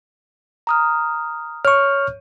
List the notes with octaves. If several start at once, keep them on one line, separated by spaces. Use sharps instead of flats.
A#5 D#6 F6
C#5 C#6 F6